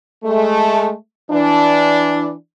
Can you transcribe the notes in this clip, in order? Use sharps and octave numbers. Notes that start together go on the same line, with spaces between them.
G#3 A3
E3 D4